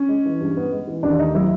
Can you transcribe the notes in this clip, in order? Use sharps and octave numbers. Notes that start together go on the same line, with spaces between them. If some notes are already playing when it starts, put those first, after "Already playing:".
Already playing: C#4
G#3
E3
G2
B3
G#3
E3
D#2 D4
A3 D#4
F#3 E4